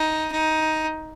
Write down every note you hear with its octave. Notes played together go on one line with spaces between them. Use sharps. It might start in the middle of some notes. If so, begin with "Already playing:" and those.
Already playing: D#4
D#4